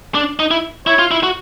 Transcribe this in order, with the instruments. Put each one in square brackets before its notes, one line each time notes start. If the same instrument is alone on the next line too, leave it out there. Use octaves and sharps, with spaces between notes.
[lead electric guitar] D4
D#4
E4
[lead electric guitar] E4 [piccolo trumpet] C#5
[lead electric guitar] F4
E4
F#4